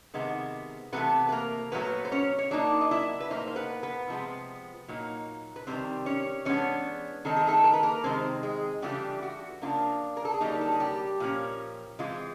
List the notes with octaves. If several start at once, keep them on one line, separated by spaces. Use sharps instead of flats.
C3 D#3 G#3 B3
C3 E3 A3 B3 B4
B4
A#3 A#4
A#2 F#3 A3 B3 B4
C5
C#4 C#5
C#5
F#3 A#3 D4 D#4 D5
D#5
E4 E5
B4
A2 F3 A#3 D#4 C5
C5
B3 B4
B3 B4
C3 F3 G#3 B3
A#2 F#3 A#3 D#4
B4
C3 D#3 G3 A#3 C4 C5
C#4 C#5
E3 G#3 B3 C#4 D4 C#5
D#3 G#3 C4 D#4 A4
G#4
A3 A4
A#4
B4
A#3 A#4
C3 D#3 G#3 C4 C5
G#3 G#4
C#3 E3 G3 A3 D4 F4 G4
F#4
C#3 F3 A#3 D4 F4
A#4
A4
G#4
D3 F#3 G3 A#3 D#4 G4
A4
G#4
G3 G4
A#2 F3 A#3 C#4
E3 G#3 C4 F4